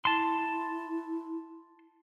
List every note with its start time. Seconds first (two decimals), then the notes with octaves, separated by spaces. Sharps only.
0.05 E4 A5 C6